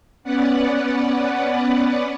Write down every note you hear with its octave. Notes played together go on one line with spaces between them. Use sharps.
B3 C#4 B4 D5 F#5